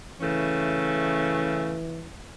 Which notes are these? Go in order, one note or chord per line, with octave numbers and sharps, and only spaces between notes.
C#3 E3 A3 C#4